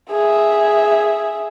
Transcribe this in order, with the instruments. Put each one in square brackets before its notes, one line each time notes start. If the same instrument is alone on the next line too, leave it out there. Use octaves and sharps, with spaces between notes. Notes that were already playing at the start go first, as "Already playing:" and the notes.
[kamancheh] G#4 E5